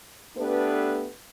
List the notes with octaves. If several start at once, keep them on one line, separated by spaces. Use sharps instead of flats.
A3 B3 D4 G4 A4 B4